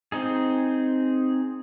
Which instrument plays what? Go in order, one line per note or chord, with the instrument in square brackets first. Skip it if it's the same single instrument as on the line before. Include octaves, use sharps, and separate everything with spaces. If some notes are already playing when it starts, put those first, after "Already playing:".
[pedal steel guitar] C4 D#4 G#4